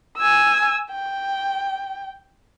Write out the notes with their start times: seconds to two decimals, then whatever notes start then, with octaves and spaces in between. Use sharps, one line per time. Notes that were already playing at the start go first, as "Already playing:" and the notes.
0.17 G#5 E6
0.91 G5